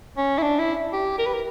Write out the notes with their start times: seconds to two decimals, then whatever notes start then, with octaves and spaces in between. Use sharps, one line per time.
0.17 C#4
0.38 E4
0.42 D4
0.59 E4
0.93 G4
1.19 A#4
1.26 B4
1.34 A#4